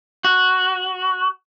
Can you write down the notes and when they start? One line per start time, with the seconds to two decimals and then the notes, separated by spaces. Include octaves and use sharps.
0.25 F#4